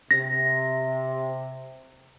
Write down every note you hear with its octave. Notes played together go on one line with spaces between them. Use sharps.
C3 A#6